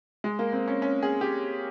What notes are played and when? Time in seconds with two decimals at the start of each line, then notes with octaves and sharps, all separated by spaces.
0.24 G#3
0.39 A#3
0.53 C4
0.68 C#4
0.82 C#4
1.02 G#4
1.21 G4